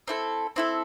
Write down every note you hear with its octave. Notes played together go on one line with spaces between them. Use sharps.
C4 E4 A4
C4 E4 A4